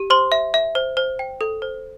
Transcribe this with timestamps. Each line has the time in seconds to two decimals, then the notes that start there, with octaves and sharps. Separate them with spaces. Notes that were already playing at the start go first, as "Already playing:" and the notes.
Already playing: G4
0.10 C5 C6
0.32 E5
0.54 E5
0.75 C5
0.97 C5
1.19 G5
1.41 A4
1.62 C5